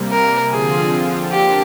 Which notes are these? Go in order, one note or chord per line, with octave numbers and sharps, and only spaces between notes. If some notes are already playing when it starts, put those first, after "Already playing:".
Already playing: C3 G3 A#3
A#4
D3 F3 C4 F4 G#4
A#3 D4 G4